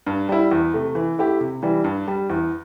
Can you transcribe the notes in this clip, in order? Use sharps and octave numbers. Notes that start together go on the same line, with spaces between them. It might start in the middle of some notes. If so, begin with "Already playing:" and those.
G2
G3 E4
E2
C3 A3
E3
A3 E4 G4
C3
E3 G3
G2
G3 D4
E2